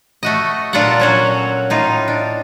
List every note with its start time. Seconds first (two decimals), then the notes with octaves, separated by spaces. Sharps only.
0.23 A3 F#4 D#5
0.73 A#2 D4 F4 A4 E5 F#5
1.00 F#3 C#4 F#4
1.70 A2 D#4 F4
2.08 D4